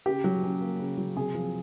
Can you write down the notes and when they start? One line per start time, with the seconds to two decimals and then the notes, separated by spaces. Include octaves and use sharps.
0.06 C#3 G4
0.24 F#3
0.43 C#4
0.61 A#3
0.79 C#3
0.98 F#3
1.17 C3 G#4
1.35 F3